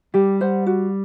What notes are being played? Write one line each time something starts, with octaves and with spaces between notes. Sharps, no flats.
G3 G4
C5 F#5
F#4